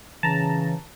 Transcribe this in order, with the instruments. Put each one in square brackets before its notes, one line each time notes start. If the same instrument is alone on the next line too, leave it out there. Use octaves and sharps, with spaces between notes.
[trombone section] C#3 [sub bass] E3 [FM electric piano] A5 A#5